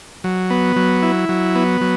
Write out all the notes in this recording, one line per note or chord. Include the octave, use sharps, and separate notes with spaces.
F#3
B3
F#3
E4
F#3
B3
F#3